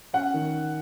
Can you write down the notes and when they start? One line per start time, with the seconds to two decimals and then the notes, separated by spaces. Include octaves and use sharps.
0.13 C#4 F#5
0.34 D#3